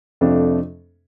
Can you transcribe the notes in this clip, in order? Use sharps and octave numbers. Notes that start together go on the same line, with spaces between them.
F2 C3 F3 A3 D4